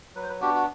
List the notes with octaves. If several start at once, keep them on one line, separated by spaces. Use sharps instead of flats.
F#3 B4
C5
B4
B3 D4 F#4 G4
F#4